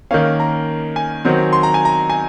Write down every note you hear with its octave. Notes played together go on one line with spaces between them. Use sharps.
D#3 A#3 C#4 F5
A#5
G#5
D#3 F#3 C4
C6
A#5
G#5
A#5
G#5